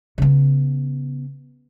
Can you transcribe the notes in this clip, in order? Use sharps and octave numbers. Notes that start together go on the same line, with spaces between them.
C#3 B3